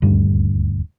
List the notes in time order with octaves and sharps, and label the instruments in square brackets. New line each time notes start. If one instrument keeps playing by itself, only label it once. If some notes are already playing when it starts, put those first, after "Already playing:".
[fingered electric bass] D#1 D2 G2 G3